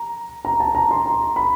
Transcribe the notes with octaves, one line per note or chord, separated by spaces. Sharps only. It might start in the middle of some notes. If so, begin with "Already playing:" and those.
Already playing: A#5
A#5
A5
A#5
C6
A#5
B5